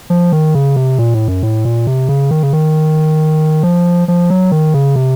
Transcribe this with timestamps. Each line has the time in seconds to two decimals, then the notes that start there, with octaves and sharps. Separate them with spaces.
0.10 F3
0.32 D#3
0.55 C#3
0.76 C3
0.99 A#2
1.14 A2
1.28 F#2
1.43 A2
1.65 A#2
1.87 C3
2.09 C#3
2.31 D#3
2.43 C#3
2.53 D#3
3.63 F3
4.08 F3
4.30 F#3
4.52 D#3
4.74 C#3
4.96 C3